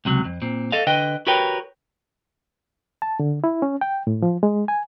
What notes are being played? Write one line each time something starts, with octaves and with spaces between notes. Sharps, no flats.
C#2 C3 F#3
F2
A#2 C4
A4 D#5 F5
D3 B4 D#5 G5
F#4 G4 A#4 B4 C#5 G5
A5
D3
E4
C#4
G5
A2
F3
G#3
G#5